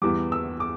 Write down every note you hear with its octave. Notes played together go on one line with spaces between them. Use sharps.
E2 E3 G3 D6
E6
D6